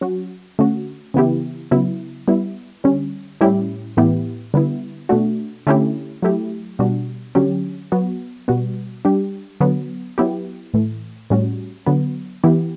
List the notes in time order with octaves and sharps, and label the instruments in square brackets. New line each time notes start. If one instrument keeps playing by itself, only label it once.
[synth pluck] F#3 C#4 F#4
D3 A3 C#4 F#4
C#3 E3 B3 E4 G4
C#3 F#3 B3 E4
G3 B3 E4
D3 G3 C#4
A2 G3 C#4 E4 G4
A2 E3 B3 E4 G4
D3 G3 B3 E4
B2 A3 D4 F#4
D3 A3 C#4 E4 G4
F#3 A3 E4 G4
B2 G3 D4 F#4
D3 F#3 C#4 G4
F#3 B3 F#4
B2 G3 B3 F#4
G3 D4 G4
D3 F#3 B3
F#3 B3 E4 G4
A2 E3 A3
A2 G3 C#4 F#4
D3 F#3 B3
E3 B3 E4 G4